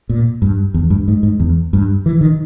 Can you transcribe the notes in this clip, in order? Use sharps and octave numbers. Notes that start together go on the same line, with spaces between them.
A#2
G2
E2
G2
G#2
G#2
E2
G2
E3
D#3